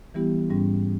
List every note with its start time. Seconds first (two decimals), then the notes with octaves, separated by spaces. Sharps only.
0.14 E3 G3 B3 E4 G4
0.50 G#2 G3 C#4